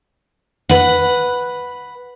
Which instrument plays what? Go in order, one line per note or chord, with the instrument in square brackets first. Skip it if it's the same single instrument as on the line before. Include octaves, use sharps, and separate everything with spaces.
[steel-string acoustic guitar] B4 F#5